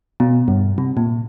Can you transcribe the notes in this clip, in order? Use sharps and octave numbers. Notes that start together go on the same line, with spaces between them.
B2
G2
C3
A#2